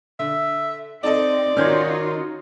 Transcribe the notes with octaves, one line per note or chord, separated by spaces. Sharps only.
D3 E5
C4 D#4 A4 D5 D#5
D#3 C#4 D#4 F4 F#4 F6 G6 G#6